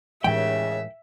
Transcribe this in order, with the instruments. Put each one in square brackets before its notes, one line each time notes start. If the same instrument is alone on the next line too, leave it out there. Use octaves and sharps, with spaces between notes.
[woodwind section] D#2 C#3 [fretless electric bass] A2 E3 G#3 [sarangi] E5 [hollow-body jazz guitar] G5